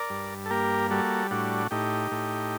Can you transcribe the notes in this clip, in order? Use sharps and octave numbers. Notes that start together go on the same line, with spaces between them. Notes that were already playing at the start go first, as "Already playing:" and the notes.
Already playing: A#4 D5
G2
A4
A#3 G4 A#4
G3 F#4 A4
A2 D4 F#4
A2 D#4 G4
A2